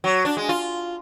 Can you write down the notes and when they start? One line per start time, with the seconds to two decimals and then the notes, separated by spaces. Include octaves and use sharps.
0.04 F#3
0.25 D4
0.37 G#3
0.49 F4